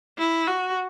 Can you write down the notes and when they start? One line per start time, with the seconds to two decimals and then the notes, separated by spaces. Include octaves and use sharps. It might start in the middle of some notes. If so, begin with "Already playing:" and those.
0.18 E4
0.47 F#4